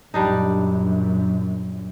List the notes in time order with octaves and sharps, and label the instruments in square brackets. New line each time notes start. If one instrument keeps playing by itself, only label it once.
[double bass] A#1 F#2 [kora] G3 D4 D#4